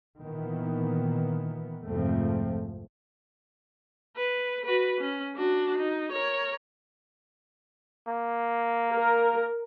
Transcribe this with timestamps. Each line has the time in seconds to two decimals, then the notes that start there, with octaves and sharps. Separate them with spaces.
0.21 A#2 D#3 E3 B3
1.86 C2 F2 G#2 F3 A3 C4
4.17 B4
4.65 F#4 B4
5.01 C#4
5.36 D4 F#4
5.78 D#4
6.12 A#4 C#5
8.08 A#3
8.92 A#4